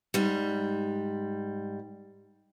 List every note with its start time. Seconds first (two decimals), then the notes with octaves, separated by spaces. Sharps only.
0.14 G#2 G3